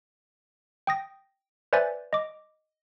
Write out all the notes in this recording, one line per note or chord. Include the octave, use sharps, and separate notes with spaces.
G5 D#6 A#6
B4 C5 D5 E5 G#5 A6
D#5 D6